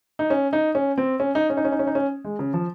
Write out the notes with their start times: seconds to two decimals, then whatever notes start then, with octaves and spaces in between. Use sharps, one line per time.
0.19 D#4
0.30 C#4
0.53 D#4
0.75 C#4
0.98 C4
1.20 C#4
1.35 D#4
1.50 C#4
1.57 D#4
1.65 C#4
1.72 D#4
1.79 C#4
1.87 D#4
1.95 C#4
2.24 G#3
2.39 C#3
2.54 F3